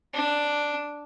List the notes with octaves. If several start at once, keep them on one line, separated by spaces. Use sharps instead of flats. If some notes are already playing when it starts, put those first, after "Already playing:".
D4